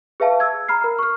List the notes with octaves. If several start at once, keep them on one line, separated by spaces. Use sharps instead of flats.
G#4 B4 E5 F5 A5
E6 G#6
A#5 B5 F6 C7
A#4
C#6 F6